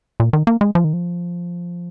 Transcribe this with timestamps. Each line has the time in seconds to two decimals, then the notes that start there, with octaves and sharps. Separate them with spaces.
0.20 A#2
0.33 D#3
0.47 A#3
0.61 G#3
0.75 F3
0.84 D#3
0.93 F3